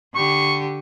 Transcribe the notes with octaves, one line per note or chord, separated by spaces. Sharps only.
D3 G4 C#6